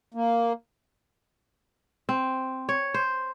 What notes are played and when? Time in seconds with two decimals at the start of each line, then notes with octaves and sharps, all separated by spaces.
0.14 A#3
2.09 C4
2.69 C#5
2.94 C5